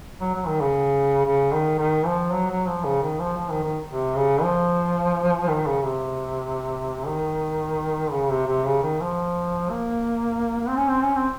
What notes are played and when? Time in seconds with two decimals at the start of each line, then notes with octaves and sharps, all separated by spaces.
0.21 F#3
0.34 F#3
0.47 D#3
0.61 C#3
1.26 C#3
1.53 D#3
1.78 D#3
2.06 F3
2.32 F#3
2.50 F#3
2.67 F3
2.84 C#3
3.02 D#3
3.19 F3
3.37 F3
3.50 D#3
3.64 D#3
3.91 C3
4.16 C#3
4.42 F3
5.48 D#3
5.66 C#3
5.84 C3
7.06 D#3
8.12 C#3
8.30 C3
8.47 C3
8.65 C#3
8.83 D#3
9.00 F3
9.70 A#3
10.60 A#3
10.68 C4
10.76 C#4
10.88 C4
11.03 C#4
11.15 C4